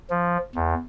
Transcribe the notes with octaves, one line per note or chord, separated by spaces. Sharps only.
F3
E2